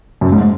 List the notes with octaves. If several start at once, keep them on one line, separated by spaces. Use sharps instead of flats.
F#2
G#2